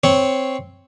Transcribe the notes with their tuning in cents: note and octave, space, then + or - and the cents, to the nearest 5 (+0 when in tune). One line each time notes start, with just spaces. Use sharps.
C4 +0 C#5 +0